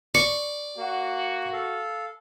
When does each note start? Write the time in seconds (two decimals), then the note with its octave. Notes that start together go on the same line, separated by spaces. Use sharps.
0.15 D5 C#6
0.77 A#3 F#4
1.53 A4 F5